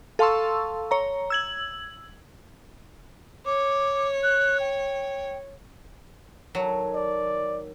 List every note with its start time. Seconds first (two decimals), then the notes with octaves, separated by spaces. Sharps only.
0.19 A4 F5 A5 C6 C#6 E6
0.91 C#5 A#5
1.30 E6 G#6 F#7
3.46 C#5 D6
4.23 F#6
4.60 G5
6.55 D#3 F#3 A4 C#5
6.95 D5